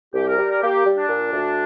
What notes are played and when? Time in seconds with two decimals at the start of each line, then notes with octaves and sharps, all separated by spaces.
0.14 C2 G4
0.26 A#4
0.38 G3
0.49 A#4
0.61 A#3 G4
0.85 G3
0.96 D4
1.08 A#2
1.32 D2